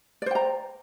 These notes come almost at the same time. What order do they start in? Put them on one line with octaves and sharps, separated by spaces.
D5 C5 G5 A#5